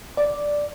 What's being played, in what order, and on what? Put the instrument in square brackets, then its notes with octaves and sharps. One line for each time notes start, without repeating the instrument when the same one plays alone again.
[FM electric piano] D5